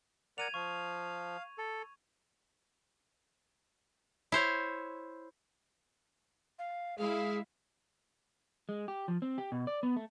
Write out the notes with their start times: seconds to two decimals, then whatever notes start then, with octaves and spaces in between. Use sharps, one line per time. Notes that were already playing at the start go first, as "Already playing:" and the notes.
0.38 A#4 D5 F#5 G#6 D#7 F7
0.54 F3 F5 C#6
1.58 A4
4.32 E4 C5 C#5
6.59 F5
6.98 G#3 E4 G#4 F5
8.69 G#3
8.88 G4
9.08 F3
9.22 C4
9.38 G4
9.52 B2
9.67 D5
9.83 B3
9.96 A3